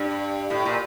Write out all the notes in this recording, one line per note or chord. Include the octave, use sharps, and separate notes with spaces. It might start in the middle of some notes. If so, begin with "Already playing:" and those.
Already playing: G2
A2
A#2